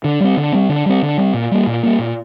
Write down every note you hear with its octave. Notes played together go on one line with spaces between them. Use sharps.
D3
G3 C4
D3
G3 C4
D3
G3 C4
D3
G3 C4
A#2
G3 A#3
A#2
G3 A#3
A#2